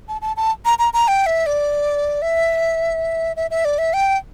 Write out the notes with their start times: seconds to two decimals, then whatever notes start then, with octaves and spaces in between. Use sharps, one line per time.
0.08 A5
0.22 A5
0.37 A5
0.65 A#5
0.79 A#5
0.93 A#5
1.08 G5
1.26 E5
1.46 D5
2.22 E5
3.36 E5
3.51 E5
3.65 D5
3.78 E5
3.94 G5